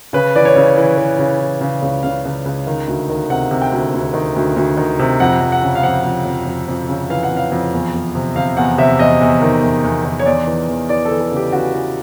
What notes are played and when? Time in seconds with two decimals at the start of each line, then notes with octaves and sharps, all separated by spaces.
0.13 C#3 B4
0.35 E3 D5
0.45 C#5
0.56 C#3
0.77 E3
0.97 E3
1.19 C#3
1.40 E3
1.61 C#3
1.82 C#2
2.03 C#2 F5
2.25 C#2
2.45 C#2
2.67 D#3
2.88 D2
3.10 D#3
3.30 C3 F#5
3.51 C3
3.62 G5
3.72 D2
3.94 D2
4.14 D#3
4.36 D2
4.56 D2
4.77 D#3
4.99 C3
5.20 F2 F#5
5.41 F2
5.52 F#5
5.62 C#3
5.75 F5
5.83 F2 F#5
6.05 F2
6.25 F2
6.46 F2
6.68 F2
6.89 C#3
7.10 E3 F5
7.23 F#5
7.30 F2
7.37 F5
7.52 F2
7.73 E2
7.94 E2
8.15 C3
8.36 C3 F5
8.57 E2 F#5
8.78 C3 E5
8.99 E2 D#5
9.21 E2
9.42 D#3
9.63 E2
9.83 E2
10.05 D#3
10.19 C#5
10.26 E2 D5
10.47 E3
10.69 E2
10.89 E3 D5
11.05 A4
11.11 E3
11.21 A4
11.31 C#3 G4
11.52 C#3 F#4
11.73 E3